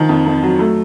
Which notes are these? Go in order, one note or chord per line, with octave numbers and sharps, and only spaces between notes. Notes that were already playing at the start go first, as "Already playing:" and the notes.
Already playing: D#3 F3
F2
F2
F#3
A3